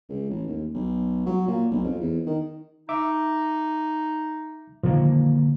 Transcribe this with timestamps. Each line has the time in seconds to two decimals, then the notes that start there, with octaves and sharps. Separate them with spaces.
0.09 C#2
0.29 A1
0.47 D#2
0.74 B1
1.26 F#3
1.48 A#2
1.71 B1
1.84 F2
2.00 E2
2.26 D#3
2.89 D#4 E5 D6
4.83 A#2 D3 D#3 F3 A#3